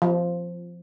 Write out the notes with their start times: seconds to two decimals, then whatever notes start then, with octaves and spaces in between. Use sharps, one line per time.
0.02 F3